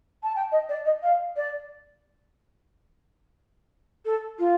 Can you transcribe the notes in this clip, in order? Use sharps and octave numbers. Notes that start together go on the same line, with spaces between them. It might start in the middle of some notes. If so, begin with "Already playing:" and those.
A5
G5
D#5
D5
D#5
F5
D5
A4
F4